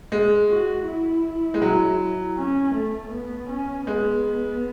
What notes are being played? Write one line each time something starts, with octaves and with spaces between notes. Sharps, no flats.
G#3
F#4
E4
G#3
F#3
C#4
A3
B3
C#4
G#3 B3